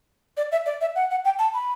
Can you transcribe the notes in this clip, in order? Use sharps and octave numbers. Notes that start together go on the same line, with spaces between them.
D5
E5
D5
E5
F#5
F#5
G5
A5
B5